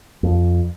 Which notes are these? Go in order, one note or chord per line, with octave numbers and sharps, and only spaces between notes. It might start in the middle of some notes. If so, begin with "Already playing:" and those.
F2